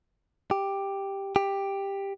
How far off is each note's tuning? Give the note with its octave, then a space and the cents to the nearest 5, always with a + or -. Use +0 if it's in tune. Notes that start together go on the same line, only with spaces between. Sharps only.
G4 +5
G4 +10